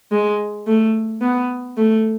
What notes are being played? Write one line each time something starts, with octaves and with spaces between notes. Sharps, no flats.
G#3
A3
B3
A3